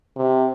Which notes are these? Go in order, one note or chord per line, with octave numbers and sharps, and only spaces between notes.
C3